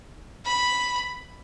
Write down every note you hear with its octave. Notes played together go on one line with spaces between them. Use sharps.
B5